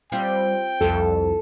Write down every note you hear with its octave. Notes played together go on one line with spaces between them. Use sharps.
G3 C4 F4 G5
C2 F2 A4